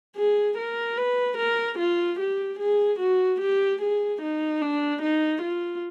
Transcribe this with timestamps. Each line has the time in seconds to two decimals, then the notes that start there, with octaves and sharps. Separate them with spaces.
0.16 G#4
0.58 A#4
0.97 B4
1.38 A#4
1.79 F4
2.19 G4
2.59 G#4
3.00 F#4
3.41 G4
3.82 G#4
4.22 D#4
4.62 D4
5.02 D#4
5.42 F4